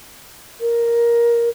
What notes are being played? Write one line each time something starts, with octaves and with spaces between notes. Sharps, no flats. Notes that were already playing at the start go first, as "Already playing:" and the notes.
A#4